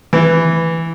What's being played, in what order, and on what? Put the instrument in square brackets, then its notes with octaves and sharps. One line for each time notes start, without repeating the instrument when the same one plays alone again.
[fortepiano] E3